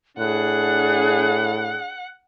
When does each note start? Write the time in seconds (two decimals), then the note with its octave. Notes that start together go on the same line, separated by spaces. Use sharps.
0.19 A2 D4 G#4 F#5 F#6